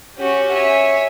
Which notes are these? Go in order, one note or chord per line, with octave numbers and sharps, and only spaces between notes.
C#4 F#4 G4
C#5 E5 G#5